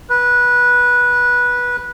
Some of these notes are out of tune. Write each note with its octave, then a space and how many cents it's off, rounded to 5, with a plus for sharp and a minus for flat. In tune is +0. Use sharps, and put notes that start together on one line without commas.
B4 -15